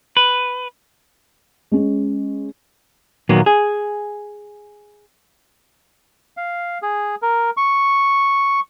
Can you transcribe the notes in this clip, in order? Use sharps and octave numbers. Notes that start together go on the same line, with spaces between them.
B4
G#3 C#4
A#2 D#3 F#3 A#3 B3
G#4
F5
G#4
A#4
C#6